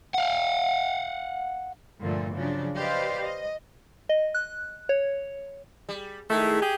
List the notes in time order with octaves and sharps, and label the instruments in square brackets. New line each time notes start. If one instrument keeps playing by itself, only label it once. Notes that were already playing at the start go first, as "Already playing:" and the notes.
[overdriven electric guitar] F5 F#5
[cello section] G2 A#2 D3 F3 A3
C#3 F3 F#3 D4
G4 B4 C5 D5 D#5 F5
D#5
[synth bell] D#5
F#6
C#5
[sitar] G3
[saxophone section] D#3 A3 E4 [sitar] G#3
[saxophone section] G4 G#4